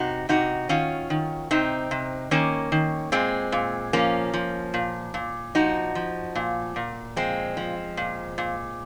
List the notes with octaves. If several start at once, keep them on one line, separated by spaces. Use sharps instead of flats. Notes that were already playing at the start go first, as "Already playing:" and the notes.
Already playing: C3 D#4 F#4
C3 D#4 F#4
D#3 C#4 F4
D#3
C3 C4 D#4
C3
D#3 A#3 C#4
D#3
A#2 G#3 C4
A#2
F3 A#3 C#4
F3
A#2
A#2
F3 D#4 F#4
F3
A#2
A#2
F3 G#3 C4
F3
A#2
A#2